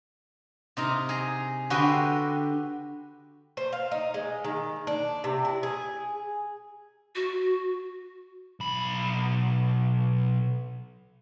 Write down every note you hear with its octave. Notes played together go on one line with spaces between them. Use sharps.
C3 D#4 A#4
G#4 A#5
D3 F#4 G4 B4 D#5 C6
C5
F5
D#4
G#3
D#3
D4
C3
E4
G#4
F#4
B1 B5